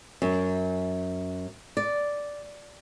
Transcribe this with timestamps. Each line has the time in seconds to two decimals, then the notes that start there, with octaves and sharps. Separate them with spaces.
0.22 F#2
1.77 D5